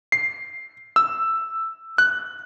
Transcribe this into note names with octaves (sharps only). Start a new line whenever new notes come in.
C7
E6
F#6